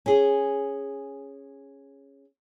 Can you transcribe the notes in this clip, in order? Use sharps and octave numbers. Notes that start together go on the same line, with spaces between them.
C#4 G#4